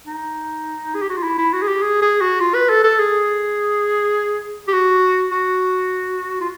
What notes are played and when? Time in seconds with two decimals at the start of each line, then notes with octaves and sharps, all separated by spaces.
0.07 D#4
0.95 G#4
1.02 G4
1.10 F#4
1.17 F4
1.23 E4
1.38 E4
1.53 F#4
1.62 G#4
1.68 G4
1.82 G#4
2.02 G#4
2.21 F#4
2.40 F4
2.54 B4
2.69 A4
2.84 A4
2.99 G#4
4.68 G4
4.73 F#4
5.31 F#4
6.41 F4